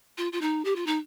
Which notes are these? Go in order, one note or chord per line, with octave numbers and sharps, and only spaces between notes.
F4
F4
D#4
G4
F4
D#4